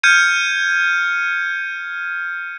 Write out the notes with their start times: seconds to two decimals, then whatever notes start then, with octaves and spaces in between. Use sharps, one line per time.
0.03 F6 G6 G#6 C#7 D#7